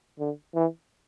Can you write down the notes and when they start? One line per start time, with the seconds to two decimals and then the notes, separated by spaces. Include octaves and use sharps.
0.19 D3
0.55 E3